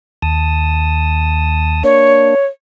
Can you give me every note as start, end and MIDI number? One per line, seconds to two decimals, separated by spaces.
0.22 1.83 39
0.22 1.83 81
0.22 1.83 87
1.84 2.35 58
1.84 2.35 62
1.84 2.46 73